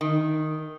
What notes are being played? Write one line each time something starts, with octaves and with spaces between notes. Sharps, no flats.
D#3